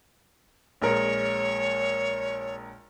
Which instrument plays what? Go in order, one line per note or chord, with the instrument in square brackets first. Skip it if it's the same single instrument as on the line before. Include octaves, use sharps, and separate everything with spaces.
[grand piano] A#1 G#3 A#4 [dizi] C#5